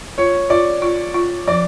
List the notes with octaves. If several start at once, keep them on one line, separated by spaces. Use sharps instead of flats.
F4 C#5
F4 D5
F4
F4
F3 D5